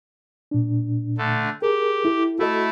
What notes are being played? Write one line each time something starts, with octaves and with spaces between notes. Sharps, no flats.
A#2 D4
D3 A3
G4 G#4 A#4
E4 A4
A3 E4 F#4 A4 D#5